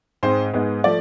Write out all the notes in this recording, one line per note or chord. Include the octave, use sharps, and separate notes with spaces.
G#2 G#3 C4 C5
G#2 G#3 B3
F3 A3 D5